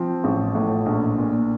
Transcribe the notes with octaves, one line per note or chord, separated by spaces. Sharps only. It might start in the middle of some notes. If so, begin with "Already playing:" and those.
Already playing: F3 C4
A1
A2
A#1
A#2